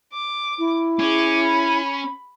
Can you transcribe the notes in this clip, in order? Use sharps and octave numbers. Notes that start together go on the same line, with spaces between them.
D6
E4
C#4 G#4 D6
B5